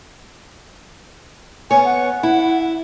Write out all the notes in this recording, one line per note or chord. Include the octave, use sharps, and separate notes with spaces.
B3 C#5 G#5
F#5
E4